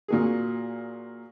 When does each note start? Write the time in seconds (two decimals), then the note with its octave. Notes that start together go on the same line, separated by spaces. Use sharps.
0.08 A#2 F#3 G#4